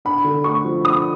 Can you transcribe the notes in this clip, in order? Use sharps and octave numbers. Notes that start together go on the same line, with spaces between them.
D4 B5
D3
A3 C#6
F3
D4 D#6